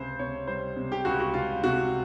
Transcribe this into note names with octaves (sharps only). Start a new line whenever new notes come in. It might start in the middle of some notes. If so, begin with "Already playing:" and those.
Already playing: C#2 C3 C5
C3 C#5
G3 C5
C3
G4
C#2 F#4
F#4
C#2 F4
C3 F#4